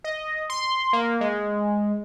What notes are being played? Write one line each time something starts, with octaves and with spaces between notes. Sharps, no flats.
D#5
C6
A#3
G#3